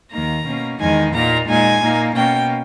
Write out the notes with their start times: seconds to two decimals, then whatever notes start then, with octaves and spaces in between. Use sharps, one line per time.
0.11 D#2 D#3 A#3 A#5
0.46 B2 A#3 C#4
0.79 E2 D#3 G#3 D#4 G#5
1.13 A#2 A#3 D#4 A#5
1.47 A#2 G#3 D#4 G#5
1.81 A#2 A#3 D#4
2.15 B2 A#3 C#4 G5